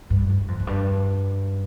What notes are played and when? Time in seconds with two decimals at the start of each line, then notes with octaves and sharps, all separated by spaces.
0.10 G2
0.30 G2
0.48 F2
0.60 F2
0.67 G2